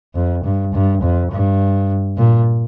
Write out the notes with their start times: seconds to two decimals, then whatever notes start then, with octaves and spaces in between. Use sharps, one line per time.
0.15 F2
0.44 G2
0.74 G2
1.02 F2
1.31 G2
2.17 A#2